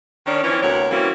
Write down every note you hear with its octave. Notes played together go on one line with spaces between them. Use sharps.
D#3 C#4 D4
E3 F3 C4 C#4
D2 C3 B3 A#4 C#5
E3 G3 A#3 C4 C#4 F#4